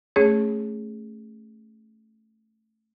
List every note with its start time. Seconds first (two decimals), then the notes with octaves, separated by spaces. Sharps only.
0.16 A3 C#4 G#4 C#5